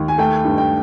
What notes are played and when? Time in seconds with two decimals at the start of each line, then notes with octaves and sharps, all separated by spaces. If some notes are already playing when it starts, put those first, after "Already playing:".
Already playing: D#2
0.08 G#5
0.18 A3 G5
0.45 G2
0.58 G5